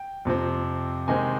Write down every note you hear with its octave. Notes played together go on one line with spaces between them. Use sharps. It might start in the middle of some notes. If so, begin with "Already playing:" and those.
Already playing: G5
F2 C3 F3 C4
C3 D#3 G#3 C4 G#5